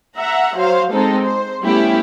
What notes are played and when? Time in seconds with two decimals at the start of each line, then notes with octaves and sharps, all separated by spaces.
0.17 E5 F#5 A#5
0.57 F#3 C5 F5
0.93 G#3 C4 D#4 A4
1.22 C5
1.62 G3 A3 B3 C#4 E4 G4